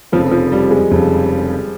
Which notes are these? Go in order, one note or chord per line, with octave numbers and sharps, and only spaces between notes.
F1 F2 C#3 F3
F3
G3
G#3
F1 F2 C#3